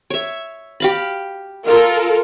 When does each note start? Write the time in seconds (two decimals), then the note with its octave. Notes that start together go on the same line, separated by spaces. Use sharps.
0.10 C#5 E5
0.80 G4 F5 B5
1.66 F4 A4 A#4